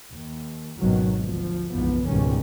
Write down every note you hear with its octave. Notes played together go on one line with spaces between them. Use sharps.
D#2
G#1 C#2 B2 D#3 F#3
D2 F3
F#1 B1 E2 G#2 F3 B3
C#2 G#2 B2 D#3 G3 C#4